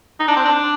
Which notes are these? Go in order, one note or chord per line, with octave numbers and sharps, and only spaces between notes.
D#4
D4
C4
D4